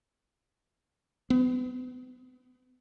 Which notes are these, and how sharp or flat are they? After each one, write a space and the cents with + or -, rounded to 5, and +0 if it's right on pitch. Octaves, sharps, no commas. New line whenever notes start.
B3 +35